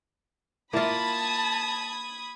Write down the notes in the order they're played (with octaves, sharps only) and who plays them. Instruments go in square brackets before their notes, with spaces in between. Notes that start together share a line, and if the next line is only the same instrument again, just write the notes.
[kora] A#3 F4 [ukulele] E4 [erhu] A5 [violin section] B5 D#6 G#6